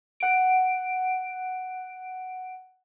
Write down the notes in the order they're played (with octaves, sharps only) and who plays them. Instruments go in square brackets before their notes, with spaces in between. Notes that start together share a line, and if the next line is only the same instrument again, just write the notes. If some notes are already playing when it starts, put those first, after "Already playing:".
[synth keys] F#5 D7